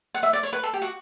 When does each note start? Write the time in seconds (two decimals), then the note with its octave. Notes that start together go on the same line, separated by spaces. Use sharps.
0.14 F#5
0.23 E5
0.33 D5
0.43 C#5
0.53 B4
0.63 A4
0.73 G4
0.82 F#4